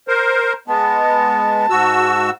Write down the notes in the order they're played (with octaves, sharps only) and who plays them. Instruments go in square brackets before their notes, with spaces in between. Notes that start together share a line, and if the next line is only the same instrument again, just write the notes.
[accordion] A#4 C5
[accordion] G#3 B3 [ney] A5
[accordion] G#2 F#4 E6